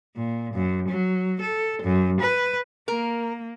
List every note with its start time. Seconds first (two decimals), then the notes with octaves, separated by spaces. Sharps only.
0.16 A#2
0.54 F#2
0.89 F#3
1.41 A4
1.82 F#2
2.20 B4
2.88 A#3 A#4